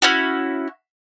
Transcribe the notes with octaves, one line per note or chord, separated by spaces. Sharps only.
C#4 E4 F#4